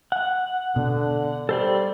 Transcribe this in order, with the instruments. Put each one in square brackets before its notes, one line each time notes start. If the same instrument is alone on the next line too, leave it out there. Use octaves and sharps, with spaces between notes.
[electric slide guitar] F#5
[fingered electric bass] B2 [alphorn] D3
[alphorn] G3 [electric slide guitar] A4 C5 D5